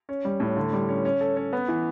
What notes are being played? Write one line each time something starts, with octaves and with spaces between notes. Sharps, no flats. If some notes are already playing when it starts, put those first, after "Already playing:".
C#4
G3
A2
D3
G3
C#4
C#4
A4
C#4
B3
E3